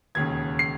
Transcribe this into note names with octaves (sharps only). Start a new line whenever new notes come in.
E1 D#2 C#3 G#6
C7